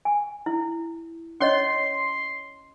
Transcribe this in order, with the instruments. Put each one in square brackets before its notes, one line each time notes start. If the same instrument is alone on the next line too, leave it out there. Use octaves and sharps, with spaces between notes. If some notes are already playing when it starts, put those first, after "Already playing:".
[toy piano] G#5
E4
[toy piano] C#4 C#5 D#5 [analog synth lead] C6